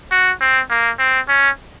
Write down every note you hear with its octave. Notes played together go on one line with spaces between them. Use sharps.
F#4
C4
A#3
C4
C#4